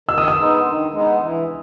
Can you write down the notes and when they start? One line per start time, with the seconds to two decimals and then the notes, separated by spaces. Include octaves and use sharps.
0.09 D#3 E6
0.18 D#6
0.28 E6
0.37 G#3 B3 D#4
0.64 D#3
0.93 G#3 B3 D#4
1.21 E3